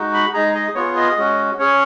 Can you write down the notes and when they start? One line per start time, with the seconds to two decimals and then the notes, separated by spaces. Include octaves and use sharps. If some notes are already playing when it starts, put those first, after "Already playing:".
Already playing: G#3 D#4 F#4
0.14 B5
0.34 G#3 D#4 G#4 A#5
0.55 D#5
0.75 B3 F4 G#4 C#5
0.97 D#5
1.17 G#3 C#4 F#4
1.59 C#4 G#4 C#5